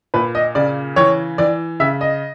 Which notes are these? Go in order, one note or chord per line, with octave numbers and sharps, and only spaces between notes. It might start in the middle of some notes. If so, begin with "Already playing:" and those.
A#2 B4
D#5
C#3 D5
E3 C#5
E3 D5
C#3 E5
D#5